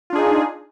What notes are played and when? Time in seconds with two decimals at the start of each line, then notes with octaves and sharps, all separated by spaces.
0.10 F4
0.13 D4
0.15 G#4
0.18 D#4